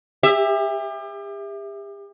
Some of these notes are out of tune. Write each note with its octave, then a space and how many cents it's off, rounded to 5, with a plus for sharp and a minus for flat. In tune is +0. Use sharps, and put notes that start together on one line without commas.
G4 +40 E5 +0